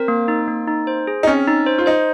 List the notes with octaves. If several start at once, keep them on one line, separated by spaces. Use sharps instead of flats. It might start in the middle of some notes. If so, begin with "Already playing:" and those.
Already playing: C4 A#4
A#3
D#4
A#3
D#4
C5
G#4
D#4
C4 C#4
D#4
C5
F4
D#4 C5